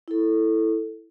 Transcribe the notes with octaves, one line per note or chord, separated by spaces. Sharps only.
E4 A4